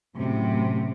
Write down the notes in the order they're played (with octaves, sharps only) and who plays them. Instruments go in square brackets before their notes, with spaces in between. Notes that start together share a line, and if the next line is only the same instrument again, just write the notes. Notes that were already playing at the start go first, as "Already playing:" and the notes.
[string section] F#2 A2 C3